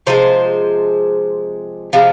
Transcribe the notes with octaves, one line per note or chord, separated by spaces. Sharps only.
C3 F3 G#3 C5
C3 F3 G#3